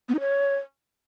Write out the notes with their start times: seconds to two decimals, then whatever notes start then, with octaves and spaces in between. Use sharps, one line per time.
0.09 B3
0.14 D#4
0.20 C#5